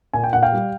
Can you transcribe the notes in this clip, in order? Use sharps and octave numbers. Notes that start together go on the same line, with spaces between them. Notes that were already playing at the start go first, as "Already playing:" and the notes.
A#2 G#5
G5
A#2 F#5
F5 G5
G3